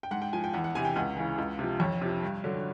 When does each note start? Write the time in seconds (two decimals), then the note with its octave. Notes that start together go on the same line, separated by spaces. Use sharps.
0.03 G5
0.11 G#2 F#5
0.22 G5
0.33 F3 G#5
0.44 G5
0.53 E2 F#5
0.64 F#5
0.75 C3 E3 G#5
0.85 G5
0.96 C#2 F#5
1.17 C#3 E3
1.38 C#2
1.59 C3 F3
1.80 F2 C#5
2.01 C3 F3
2.23 G2
2.44 D3 F#3